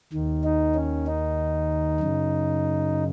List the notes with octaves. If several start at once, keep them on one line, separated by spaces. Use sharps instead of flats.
D#2 D#3
D#4
C#4
D#4
F#2 C#3